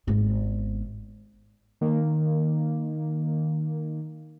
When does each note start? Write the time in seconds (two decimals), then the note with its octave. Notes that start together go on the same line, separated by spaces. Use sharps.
0.07 G#1 B3
1.81 D#3 A#3